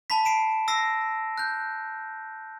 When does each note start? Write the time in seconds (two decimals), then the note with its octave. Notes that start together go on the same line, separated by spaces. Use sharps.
0.10 A5 B5 B6
0.25 C7 D7 E7
0.68 E6 A#6 C7
1.38 F#6 G6